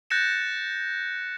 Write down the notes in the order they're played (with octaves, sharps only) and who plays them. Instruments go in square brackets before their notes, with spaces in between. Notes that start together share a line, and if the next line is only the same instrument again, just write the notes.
[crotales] F#6 G6 A6 A#6 C#7 E7